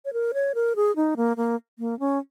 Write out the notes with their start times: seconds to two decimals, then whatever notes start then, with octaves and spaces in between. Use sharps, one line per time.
0.05 C#5
0.13 A#4
0.34 C#5
0.55 A#4
0.76 G#4
0.96 D#4
1.16 A#3
1.37 A#3
1.79 A#3
1.99 C#4